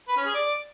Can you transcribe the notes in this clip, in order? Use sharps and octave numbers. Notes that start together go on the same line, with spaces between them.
B4
C#4
G#4
D5